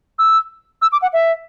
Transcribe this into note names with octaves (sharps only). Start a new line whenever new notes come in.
E6
E6
D6
F#5
E5